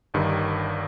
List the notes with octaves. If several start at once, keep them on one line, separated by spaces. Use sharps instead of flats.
G1 G2 D#3